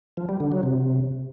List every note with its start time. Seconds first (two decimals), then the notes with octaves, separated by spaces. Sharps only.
0.17 F3
0.29 G3
0.40 D3
0.52 F#3
0.63 C3